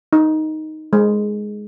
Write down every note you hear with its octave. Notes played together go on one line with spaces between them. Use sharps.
D#4
G#3